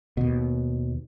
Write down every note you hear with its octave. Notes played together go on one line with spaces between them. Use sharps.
D#2 B2